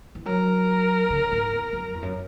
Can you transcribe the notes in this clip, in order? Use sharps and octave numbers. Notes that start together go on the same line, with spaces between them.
E3
F#3 A#4
C#3
G#2
E2
F#2
E2
F#2